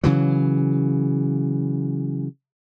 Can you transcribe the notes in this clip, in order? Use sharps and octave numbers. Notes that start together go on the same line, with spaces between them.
C#3 E3 F#3